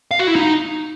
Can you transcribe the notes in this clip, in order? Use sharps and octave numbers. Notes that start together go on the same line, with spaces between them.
F5
F#4
E4
D#4